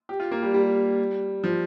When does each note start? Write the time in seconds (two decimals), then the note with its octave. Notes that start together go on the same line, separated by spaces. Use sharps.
0.09 G4
0.20 F4
0.31 A#3
0.42 G3
0.54 G3
1.44 F3